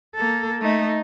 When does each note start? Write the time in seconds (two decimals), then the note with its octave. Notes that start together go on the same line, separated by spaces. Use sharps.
0.15 A#3 A4
0.61 A3 D#4